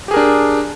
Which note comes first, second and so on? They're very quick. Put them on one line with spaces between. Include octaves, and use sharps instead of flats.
G4 G#4 A#4 D4